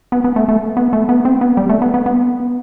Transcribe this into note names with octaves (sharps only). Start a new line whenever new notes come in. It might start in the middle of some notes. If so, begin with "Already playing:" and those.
B3
B3
A3
A3
B3
A3
B3
C4
B3
G3
A3
B3
B3
B3